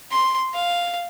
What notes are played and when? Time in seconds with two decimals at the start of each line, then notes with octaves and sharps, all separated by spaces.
0.11 C6
0.54 F5